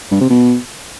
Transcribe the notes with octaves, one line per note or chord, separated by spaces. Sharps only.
G2
C3
B2